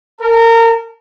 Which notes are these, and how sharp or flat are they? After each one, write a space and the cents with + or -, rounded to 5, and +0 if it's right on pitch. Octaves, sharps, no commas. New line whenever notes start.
A#4 -25 A5 +0